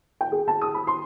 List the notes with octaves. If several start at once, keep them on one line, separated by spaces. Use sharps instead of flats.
G5
G#4
A5
D#6
B5
C6